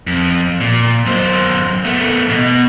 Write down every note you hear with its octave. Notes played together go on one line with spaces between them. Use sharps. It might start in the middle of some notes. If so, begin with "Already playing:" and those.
F2
A#2
F#2 C5
A3 B3
B2